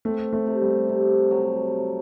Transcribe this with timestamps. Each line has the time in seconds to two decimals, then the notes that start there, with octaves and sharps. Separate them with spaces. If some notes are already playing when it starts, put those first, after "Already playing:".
0.05 A3 C4
0.33 A3
0.47 C3
0.61 G3
0.89 C3
1.31 F#3